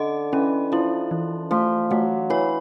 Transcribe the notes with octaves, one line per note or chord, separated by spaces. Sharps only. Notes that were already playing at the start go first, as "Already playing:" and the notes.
Already playing: D3 D#5
E3 C#4
F3 E4
E3
F3 A3
F#3 A3
E3 C#5